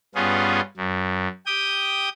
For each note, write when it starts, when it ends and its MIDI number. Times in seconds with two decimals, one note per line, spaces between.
0.15 0.61 43
0.15 0.61 59
0.15 0.61 61
0.15 0.61 65
0.15 0.61 68
0.77 1.28 42
1.46 2.09 67
1.46 2.09 79
1.46 2.09 87
1.46 2.09 91